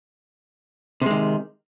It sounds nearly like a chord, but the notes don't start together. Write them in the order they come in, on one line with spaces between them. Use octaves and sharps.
C3 G#3 D#3